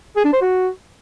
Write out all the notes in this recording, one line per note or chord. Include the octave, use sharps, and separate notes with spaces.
G#4
D4
C5
F#4